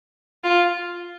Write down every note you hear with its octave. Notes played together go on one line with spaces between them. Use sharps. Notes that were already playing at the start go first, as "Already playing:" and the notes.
F4